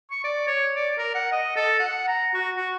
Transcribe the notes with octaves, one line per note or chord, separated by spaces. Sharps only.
C#6
D5
C#5
D5
A#4
F#5
D#5
A4
F#5
A#5
F#4
F#4